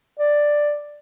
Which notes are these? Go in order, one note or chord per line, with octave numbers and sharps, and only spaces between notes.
D5